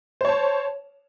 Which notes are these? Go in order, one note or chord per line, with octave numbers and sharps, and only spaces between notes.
C5 C#5 A5